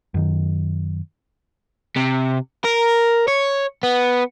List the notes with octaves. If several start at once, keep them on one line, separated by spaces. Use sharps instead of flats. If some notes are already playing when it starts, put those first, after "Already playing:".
F#2 D#3
C3
A#4
C#5
B3